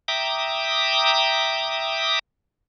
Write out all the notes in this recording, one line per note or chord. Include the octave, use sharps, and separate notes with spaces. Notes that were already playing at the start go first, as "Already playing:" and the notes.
E5 G5 A#5 D6 D#6